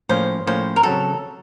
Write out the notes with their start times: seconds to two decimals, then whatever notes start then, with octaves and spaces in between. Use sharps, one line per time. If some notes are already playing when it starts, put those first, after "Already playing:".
0.09 A2 F3 A#3 C#4 C5
0.47 A2 F3 A#3 C#4 C5
0.76 A#4
0.83 C#3 F#3 C4 F#4 A4